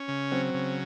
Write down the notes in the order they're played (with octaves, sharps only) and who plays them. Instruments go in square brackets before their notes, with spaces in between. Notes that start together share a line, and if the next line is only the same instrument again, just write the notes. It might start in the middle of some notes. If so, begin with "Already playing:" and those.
Already playing: [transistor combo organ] C#4
C#3
[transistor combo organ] F#3 [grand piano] C4
[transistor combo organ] C#3